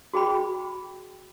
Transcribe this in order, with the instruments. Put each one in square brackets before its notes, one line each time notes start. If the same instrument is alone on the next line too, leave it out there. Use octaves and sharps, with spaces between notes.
[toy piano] F#4 G#4 G5 B5